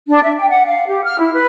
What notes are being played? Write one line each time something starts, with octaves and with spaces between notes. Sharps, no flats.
D4
E5
G5
F#5
F5
G4
F6
E4
B4